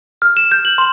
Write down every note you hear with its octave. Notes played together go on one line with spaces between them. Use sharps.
F6
E7
G6
F#7
C6